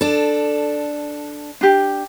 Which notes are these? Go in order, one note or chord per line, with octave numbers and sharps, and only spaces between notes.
D4 A4
D4 G4